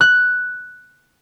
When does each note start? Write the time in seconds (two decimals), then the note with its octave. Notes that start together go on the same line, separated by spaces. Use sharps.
0.01 F#6